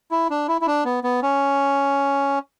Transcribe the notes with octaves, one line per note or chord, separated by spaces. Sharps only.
E4
D4
E4
E4
D4
B3
B3
C#4